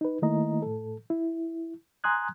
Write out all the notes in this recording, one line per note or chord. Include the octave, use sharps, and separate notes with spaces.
D#4 B4
D#3 A3 A#3 E4 D#5 A#5
A2 A4
E4
G#5 A#5 C6 D#6 F#6 G#6